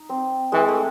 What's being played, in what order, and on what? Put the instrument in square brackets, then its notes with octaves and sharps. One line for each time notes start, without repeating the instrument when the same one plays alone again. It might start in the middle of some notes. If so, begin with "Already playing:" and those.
Already playing: [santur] D#4
C4
[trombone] E3 [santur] G#3
[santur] A3